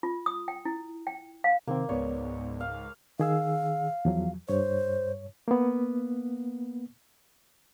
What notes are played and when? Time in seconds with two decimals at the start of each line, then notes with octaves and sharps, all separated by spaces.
0.03 F4
0.26 D#6
0.48 G5
0.65 E4
1.07 G5
1.44 F5
1.67 C3 D#3 A#3 C4
1.89 C#2 G#2 B3 C#5 D5
2.60 F5
3.20 D#3 G#4 F5 E6
4.05 E2 F3 F#3
4.49 G2 C5 C#5
5.48 A#3 B3